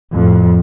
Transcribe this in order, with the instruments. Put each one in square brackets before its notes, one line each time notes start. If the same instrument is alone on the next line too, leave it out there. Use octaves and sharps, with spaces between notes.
[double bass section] F2 A2